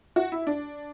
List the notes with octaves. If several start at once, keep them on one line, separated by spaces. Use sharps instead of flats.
F#4
E4
D4